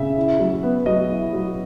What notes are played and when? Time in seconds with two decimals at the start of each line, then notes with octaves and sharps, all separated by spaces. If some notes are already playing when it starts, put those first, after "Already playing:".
Already playing: C#3 E5
0.17 E4
0.39 F#3
0.63 B3
0.86 F#3 D#5
1.10 E4
1.33 F#3